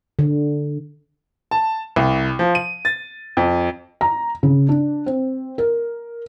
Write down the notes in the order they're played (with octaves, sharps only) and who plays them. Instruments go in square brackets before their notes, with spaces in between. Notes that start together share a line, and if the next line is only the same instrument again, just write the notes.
[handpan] D3
[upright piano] A5
C2
F3
D#7
A6
F2
[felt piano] A#5
C#3
D4
C4
A#4